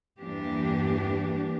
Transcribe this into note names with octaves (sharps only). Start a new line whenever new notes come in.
E2 G2 E3 A#3 D4 G4